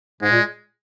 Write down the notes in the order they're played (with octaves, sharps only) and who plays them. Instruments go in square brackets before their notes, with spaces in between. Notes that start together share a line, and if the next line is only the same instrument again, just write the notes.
[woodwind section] G#2 [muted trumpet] G#3
[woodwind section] A#2